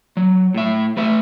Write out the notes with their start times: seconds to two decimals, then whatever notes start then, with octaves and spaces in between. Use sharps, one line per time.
0.17 F#3
0.54 A2 E5
0.97 A3 B4 E5